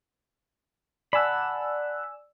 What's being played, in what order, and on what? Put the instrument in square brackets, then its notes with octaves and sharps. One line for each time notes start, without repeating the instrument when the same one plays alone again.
[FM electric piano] D5 G#5 E6 [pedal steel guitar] F#5 A5 B5